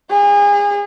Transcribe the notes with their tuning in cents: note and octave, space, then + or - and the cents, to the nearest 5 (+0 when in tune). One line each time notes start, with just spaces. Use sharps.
G#4 -35